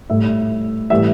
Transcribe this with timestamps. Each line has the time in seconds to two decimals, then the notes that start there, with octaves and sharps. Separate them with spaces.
0.10 A2 G3 E5
0.90 A2 E3 G3 E5